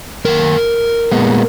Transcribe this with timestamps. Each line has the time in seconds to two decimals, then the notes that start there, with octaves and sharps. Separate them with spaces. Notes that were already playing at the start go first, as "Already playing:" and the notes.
0.25 F#2 D#3 A#3 A#4
1.12 A#2 G#3 B3